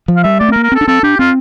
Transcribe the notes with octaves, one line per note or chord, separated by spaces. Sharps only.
F3
F5
G3 E5
A3 D5
C4
A#4
A#3
A#4
C4 A4
D4
C4 A4
D4 G4
C4 F4